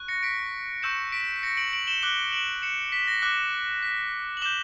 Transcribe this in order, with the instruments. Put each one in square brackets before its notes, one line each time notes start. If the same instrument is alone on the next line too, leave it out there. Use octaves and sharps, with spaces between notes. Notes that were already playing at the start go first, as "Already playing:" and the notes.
Already playing: [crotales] C#6 F#6
A#6 C#7
B6 D7
C#6 E6 G6 C#7 E7
B6 D7
A#6 C#7
D7 F#7
D7 F#7
E7 G7
D6 F#6 E7 G7
D7 F#7
C#7 E7
B6
A#6
D6 F#6
B6
F#7
D6 G6 E7 G7